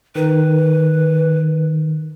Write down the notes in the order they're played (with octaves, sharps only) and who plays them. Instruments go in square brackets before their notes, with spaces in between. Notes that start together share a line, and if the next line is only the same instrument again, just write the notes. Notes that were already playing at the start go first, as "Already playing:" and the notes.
[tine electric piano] D#3 [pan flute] B4